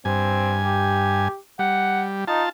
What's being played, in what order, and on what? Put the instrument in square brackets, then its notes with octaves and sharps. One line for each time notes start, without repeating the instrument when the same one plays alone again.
[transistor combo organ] G2 G#5 [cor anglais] C4
[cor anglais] G4
[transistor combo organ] G3 [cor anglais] F#5
[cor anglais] D#4 [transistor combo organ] F4 A5